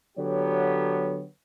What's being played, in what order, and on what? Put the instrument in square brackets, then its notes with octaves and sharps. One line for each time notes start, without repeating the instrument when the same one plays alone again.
[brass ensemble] D3 F#3 B3 G4 C#5